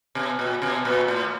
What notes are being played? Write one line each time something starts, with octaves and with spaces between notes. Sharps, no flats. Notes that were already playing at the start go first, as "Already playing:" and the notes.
B2
A#2
B2
A#2
A2